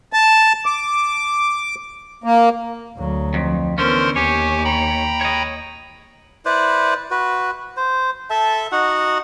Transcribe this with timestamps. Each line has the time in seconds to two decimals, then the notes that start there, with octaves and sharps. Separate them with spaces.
0.13 A5
0.66 D6
2.24 A#3
2.97 D2 F#3
3.34 F2
3.78 D3 E3 B3 C#4 A#4 C5 C6
4.16 D#2 G4 C#5 G#5
4.64 G5 A#5 B5
5.21 C#5 D#5
6.45 E4 B4 C5 D5
7.11 F#4 B4
7.77 C5
8.30 A4 E5 A5
8.72 D#4 F#4 F#5